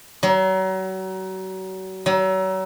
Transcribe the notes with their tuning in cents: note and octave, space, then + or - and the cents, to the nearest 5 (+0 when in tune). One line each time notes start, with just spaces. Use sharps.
F#3 +35
F#3 +35